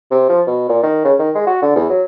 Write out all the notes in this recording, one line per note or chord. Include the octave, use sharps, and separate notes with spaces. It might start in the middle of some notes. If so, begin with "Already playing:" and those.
C3
F3
B2
A#2
D#3
C#3
D#3
G#3
F#4
D3
E2
F#3